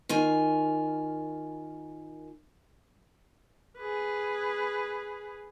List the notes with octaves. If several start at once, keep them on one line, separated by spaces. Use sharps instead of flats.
D#3 F4 A#4 G#5
G#4 B4